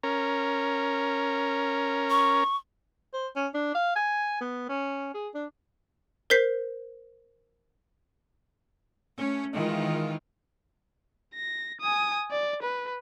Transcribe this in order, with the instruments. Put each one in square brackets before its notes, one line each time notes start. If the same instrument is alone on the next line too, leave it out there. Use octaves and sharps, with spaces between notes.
[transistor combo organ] C#4 A#4
[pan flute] C#6
[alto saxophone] C5
C#4
D4
F5
G#5
B3
C#4
G#4
D4
[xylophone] A#4 C5 G6 B6 C7
[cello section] A3 C#4
D#3 E3 G#3 F4
[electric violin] A#6
G#5 D#6
D5
B4